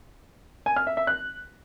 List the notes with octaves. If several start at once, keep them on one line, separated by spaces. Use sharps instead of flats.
G#5
F6
E5
E5
F#6